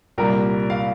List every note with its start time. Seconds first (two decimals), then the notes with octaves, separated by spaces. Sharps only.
0.18 C2 A#2 G3 A#3 A#4
0.70 F5